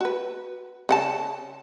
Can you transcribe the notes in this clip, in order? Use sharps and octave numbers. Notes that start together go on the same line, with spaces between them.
F#4 B4
C#3 F#5 A5